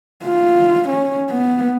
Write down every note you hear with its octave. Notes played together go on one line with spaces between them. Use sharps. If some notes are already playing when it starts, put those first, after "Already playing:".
F4
C#4
B3